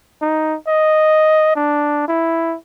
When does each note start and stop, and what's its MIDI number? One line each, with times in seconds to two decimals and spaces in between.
0.22 0.57 63
0.68 1.53 75
1.56 2.08 62
2.08 2.57 64